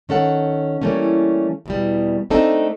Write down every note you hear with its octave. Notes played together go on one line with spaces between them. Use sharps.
D#3 C#4 A4 F#5
E3 G3 A3 A#3 C#4
E2 B2 G3
A3 C4 D4 D#4 A4